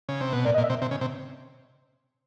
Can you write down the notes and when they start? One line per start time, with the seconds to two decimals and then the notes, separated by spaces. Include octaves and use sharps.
0.09 C#3
0.21 C3
0.33 B2
0.45 A#2 D5
0.54 D#5
0.58 A#2
0.63 E5
0.70 C3
0.82 C3
0.91 C#3
1.01 C3